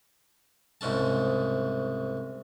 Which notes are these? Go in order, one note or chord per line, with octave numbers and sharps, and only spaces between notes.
C2 G#2 C#3 A5